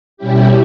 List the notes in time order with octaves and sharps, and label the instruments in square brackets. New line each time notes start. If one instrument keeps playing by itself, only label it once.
[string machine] B2 G3 C#4 E4 G4